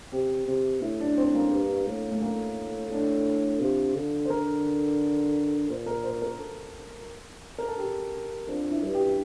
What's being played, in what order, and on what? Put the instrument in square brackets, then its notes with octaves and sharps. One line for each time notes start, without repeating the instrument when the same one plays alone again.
[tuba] C3 [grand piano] G4
[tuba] C3
[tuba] A2 [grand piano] E4
[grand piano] D4
C4
A#3
[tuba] G2
A2
[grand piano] A3
[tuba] A2 [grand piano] A#3
[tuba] A2 [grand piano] D4
[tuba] C3 [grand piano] F4
[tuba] D3
[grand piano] C5
[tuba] D3 [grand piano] A#4
[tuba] A#2 [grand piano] C5
[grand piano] A#4
C5
A#4
A4
A#4
A4
G4
[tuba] F2 [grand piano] D4
[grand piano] E4
[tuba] G2
[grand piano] G4